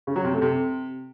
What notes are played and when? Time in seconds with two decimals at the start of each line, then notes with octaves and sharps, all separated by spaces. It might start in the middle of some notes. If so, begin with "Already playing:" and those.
0.07 C#3
0.16 F#3
0.24 C3
0.33 A3
0.42 C3